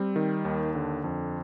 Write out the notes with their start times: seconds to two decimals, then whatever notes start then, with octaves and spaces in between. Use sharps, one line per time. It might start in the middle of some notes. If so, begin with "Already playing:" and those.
Already playing: G3 C4
0.16 D#3
0.45 D#2
0.75 D3
1.04 F2